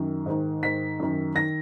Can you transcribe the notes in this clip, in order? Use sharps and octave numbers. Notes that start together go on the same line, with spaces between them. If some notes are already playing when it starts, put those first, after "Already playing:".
Already playing: F#2 D#3
G#2 D#3
G#2 D#3 B6
F#2 D#3
D#3 A#6